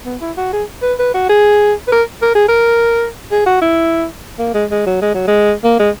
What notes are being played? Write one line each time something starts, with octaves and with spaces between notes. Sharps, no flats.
B3
E4
F#4
G#4
B4
B4
F#4
G#4
B4
A#4
A#4
G#4
A#4
G#4
F#4
E4
A#3
G#3
G#3
F#3
G#3
F#3
G#3
A#3
G#3